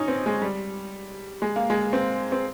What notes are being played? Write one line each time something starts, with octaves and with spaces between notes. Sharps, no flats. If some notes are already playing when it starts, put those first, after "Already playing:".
Already playing: C#4 D#4
C4
G#3
G3
G#3
A#3
G#3
C4
C4